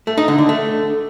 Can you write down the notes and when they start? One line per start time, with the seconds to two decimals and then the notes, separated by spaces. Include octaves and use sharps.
0.07 A3
0.18 D#4
0.28 D3
0.38 D3
0.49 A3